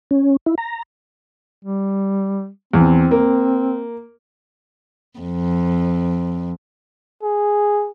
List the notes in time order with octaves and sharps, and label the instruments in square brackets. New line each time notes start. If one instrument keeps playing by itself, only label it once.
[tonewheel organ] C#4
E4
A#5
[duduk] G3
[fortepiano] E2 [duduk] C4
[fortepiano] A#3
[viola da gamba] F2
[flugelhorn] G#4